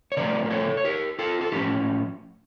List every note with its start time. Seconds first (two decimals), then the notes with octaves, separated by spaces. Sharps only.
0.12 C#5
0.17 C#3 F3 A3 A#4 D5
0.45 A#4
0.51 A4 C#5
0.77 C#5
0.85 G4 A#4
1.19 F4 A4
1.41 A4
1.52 A2 F3 C#4 E4 G4